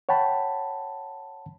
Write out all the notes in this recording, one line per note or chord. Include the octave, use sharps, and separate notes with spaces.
C#5 F#5 G5 A5 B5